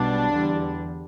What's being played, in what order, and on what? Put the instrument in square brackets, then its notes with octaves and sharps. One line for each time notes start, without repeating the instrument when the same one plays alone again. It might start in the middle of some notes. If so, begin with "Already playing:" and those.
Already playing: [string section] B1 B2 G3 D4
E2 D3 G3